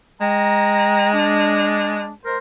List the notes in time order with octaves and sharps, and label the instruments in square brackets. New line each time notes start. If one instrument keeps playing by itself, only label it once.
[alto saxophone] G#3 [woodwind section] G5 A#5
[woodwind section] D4
G#3 A#4 C5